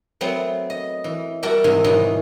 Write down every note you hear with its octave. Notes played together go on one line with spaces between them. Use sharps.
F#3 A3 B3 C4
D#5
E3
G3 F#4 A4 A#4 D5 E5
G#2 C3 D#3 E3
F2 G#2 B2 D#3 E3 F#3